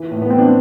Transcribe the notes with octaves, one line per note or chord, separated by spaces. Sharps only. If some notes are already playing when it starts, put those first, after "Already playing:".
Already playing: E3
A2
B3
E3 C4
D4